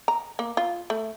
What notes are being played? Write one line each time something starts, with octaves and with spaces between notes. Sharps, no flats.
A#5
A#3
F4
A3